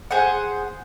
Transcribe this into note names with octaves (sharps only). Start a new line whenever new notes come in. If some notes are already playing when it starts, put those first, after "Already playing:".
G#4 C5 F#5